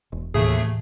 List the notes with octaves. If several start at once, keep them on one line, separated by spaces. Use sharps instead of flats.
E1
D#2 A2 C3 E3 A3 G#4